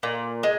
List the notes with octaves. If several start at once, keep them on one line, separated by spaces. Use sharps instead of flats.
A#2
G#3